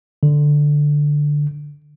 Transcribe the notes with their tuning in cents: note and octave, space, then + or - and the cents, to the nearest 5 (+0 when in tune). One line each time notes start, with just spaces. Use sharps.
D3 +5